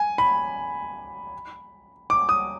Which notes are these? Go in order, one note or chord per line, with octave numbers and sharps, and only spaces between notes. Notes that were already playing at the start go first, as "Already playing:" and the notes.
Already playing: G#5
B5
D6
D#6